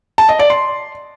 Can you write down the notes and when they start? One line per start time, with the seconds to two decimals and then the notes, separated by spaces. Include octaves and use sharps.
0.18 A5
0.29 D#5
0.39 D5
0.50 C6